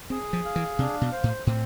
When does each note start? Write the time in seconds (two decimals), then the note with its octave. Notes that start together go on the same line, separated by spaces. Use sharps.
0.10 C4 G#4
0.33 F3
0.45 F5
0.56 E3
0.79 C3 D4
1.01 B2
1.12 C5
1.24 A2
1.46 A2 C4